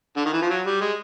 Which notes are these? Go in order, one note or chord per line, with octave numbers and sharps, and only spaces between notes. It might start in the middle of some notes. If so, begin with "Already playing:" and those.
D3
D#3
E3
F3
F#3
G3
G#3